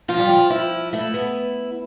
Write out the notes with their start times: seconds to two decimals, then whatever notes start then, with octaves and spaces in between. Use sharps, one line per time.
0.08 F3 F4
0.18 G3
0.29 F3
0.50 E4
0.93 A3 E4
1.14 B3